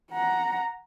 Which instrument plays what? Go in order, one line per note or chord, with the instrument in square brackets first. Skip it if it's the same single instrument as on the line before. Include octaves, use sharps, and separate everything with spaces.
[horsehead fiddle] F#5 A#5